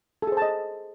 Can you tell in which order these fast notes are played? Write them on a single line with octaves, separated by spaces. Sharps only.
A4 G#4 C5 A5 D#5